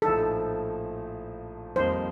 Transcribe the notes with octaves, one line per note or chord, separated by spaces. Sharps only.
A#1 A2 F3 A3 D#4 A4
F2 D#3 G3 A#3 D#4 C5